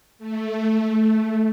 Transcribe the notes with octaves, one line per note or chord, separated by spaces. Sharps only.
A3